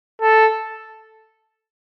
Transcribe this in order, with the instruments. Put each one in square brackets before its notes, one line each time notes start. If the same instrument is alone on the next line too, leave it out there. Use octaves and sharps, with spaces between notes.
[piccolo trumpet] A4